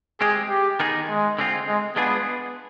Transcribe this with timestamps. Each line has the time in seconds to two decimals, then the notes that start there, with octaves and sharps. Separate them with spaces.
0.21 G#3 C4 G4 G#4
0.50 G4
0.80 D#3 B3 D#4 G#4
1.09 G#3
1.38 D3 G#3 C4 F4
1.68 G#3
1.96 G#3 B3 D4 F4 G#4